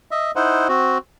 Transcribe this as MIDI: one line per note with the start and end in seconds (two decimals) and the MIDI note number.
0.11 0.31 75
0.11 0.31 76
0.36 0.68 63
0.36 0.68 64
0.36 0.68 72
0.36 0.68 78
0.68 0.98 60
0.68 0.98 66